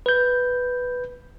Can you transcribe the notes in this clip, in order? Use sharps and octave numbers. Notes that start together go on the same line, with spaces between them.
B4 G6